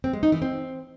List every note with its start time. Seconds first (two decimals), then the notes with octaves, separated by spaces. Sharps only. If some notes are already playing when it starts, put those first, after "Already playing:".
0.04 C4
0.13 G#3
0.23 D#4
0.32 E3
0.42 C4